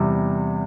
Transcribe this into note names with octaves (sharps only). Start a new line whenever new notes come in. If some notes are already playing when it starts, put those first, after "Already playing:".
Already playing: E2 C3 G3